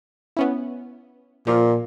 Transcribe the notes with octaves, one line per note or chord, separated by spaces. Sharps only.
B3 C#4 E4
A#2 F3 F4